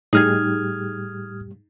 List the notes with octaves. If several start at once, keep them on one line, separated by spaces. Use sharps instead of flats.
A2 G3 D#4 G4 G#4 D#6 F6 G#6